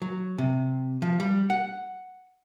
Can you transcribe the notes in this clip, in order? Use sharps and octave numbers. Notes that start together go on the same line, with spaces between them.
F#3
C3
F3
G3
F#5